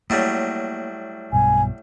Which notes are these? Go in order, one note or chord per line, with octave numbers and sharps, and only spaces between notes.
A2 F#3 G3 A#3
B1 G2 B2 G#5